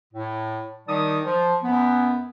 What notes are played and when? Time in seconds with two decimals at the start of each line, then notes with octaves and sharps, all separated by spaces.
0.13 A2
0.88 D#3 G3 D#4 A5 D#6
1.24 F3
1.63 F#2 B3